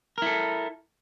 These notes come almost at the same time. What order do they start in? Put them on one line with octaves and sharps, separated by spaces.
A#4 E4 A4